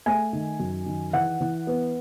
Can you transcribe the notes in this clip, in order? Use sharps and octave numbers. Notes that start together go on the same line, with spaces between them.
A3 G#5
D#3
F#2
D#3
E3 F#5
E3
B3